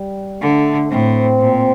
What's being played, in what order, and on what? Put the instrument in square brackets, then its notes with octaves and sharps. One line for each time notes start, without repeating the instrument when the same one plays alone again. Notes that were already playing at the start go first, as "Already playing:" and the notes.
Already playing: [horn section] G3
[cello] D3 [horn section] A3
[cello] A2 [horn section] C4
[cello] A#2